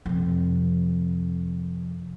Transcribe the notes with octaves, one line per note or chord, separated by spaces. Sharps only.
F2 C3